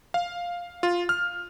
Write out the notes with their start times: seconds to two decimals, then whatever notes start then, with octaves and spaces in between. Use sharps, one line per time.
0.14 F5
0.83 F4
1.09 F6